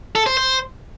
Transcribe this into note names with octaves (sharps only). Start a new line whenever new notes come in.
A4
C5
C5